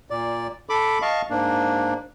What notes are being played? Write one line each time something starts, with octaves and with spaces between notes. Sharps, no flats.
A#2 D5
A4 B5 D6
D#5 F5 A5 C#6
G#2 A#3 D4